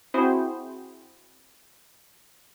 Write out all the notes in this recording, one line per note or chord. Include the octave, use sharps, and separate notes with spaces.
C4 E4 F#4 G#4 C5